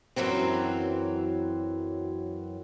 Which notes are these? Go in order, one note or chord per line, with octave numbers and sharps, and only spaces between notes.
F#2 C3 E3 F#3 C4